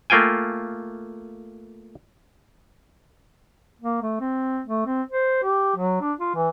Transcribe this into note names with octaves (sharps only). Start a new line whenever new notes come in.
A3 A#3 F4 G5 G#5
A#3
A3
C4
A3
C4
C5
G4
F#3
D4
F4
E3